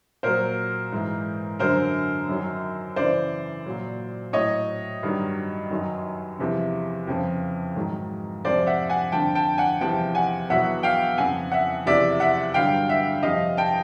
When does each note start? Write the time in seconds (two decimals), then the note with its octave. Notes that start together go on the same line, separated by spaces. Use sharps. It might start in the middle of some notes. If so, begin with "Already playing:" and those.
0.23 A#2 F#3 A#4 C5
0.92 G#2 E3
1.59 F#2 D3 F#3 A#4 C5
2.28 F#2 D#3 F#3
2.96 F#2 C#3 E3 C5 D5
3.66 A#2 F#3
4.33 A2 F#3 C#5 D#5
5.03 G2 D#3 F#3
5.70 F#2 D#3 F#3
6.39 E2 C3 F3
7.07 F2 C#3 F3
7.76 G#2 D#3 F#3
8.44 F2 C3 F3 C5 D5
8.67 E5 F#5
8.90 F#5 G#5
9.12 F2 D3 F3 G5 A5
9.35 G5 A5
9.58 F#5 G#5
9.81 E2 C3 F3 G5 A5
10.15 F#5 G#5
10.49 E2 B2 F#3 E5 F#5
10.83 F5 G5
11.18 F2 C#3 F3 F#5 G#5
11.52 E5 F#5
11.86 E2 C3 F3 D5 E5
12.20 E5 F#5
12.54 G2 D3 F#3 F5 G5
12.89 E5 F#5
13.23 F2 C3 F3 D#5 F5
13.57 G5 A5